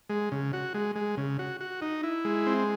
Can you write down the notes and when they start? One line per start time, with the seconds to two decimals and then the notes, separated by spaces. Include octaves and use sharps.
0.09 G#3
0.32 C#3
0.53 F#4
0.74 G#3
0.96 G#3
1.17 C#3
1.39 F#4
1.61 F#4
1.82 D#4
2.03 E4
2.25 G#3
2.47 C4